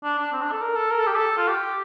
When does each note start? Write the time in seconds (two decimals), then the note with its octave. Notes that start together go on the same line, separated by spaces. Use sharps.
0.04 D4
0.19 D4
0.33 C4
0.42 D4
0.52 A4
0.62 A#4
0.76 A4
0.91 A#4
0.99 A4
1.07 G4
1.16 A4
1.38 F4
1.49 G4